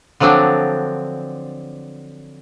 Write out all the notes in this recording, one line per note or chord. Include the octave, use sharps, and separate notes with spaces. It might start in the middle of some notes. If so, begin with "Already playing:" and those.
D3 F3 F#3 C4 D4